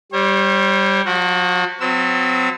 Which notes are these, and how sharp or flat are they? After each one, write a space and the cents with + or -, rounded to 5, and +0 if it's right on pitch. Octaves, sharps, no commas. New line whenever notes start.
G3 -5 C#5 -45
F3 +45 F#4 +15
F#3 -35 C4 -35 E6 +0